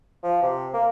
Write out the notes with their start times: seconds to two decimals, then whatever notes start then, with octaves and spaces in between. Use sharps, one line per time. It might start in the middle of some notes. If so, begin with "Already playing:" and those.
0.23 F3
0.42 C3
0.73 A#3